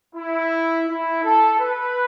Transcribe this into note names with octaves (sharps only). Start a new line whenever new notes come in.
E4
E4
A4
B4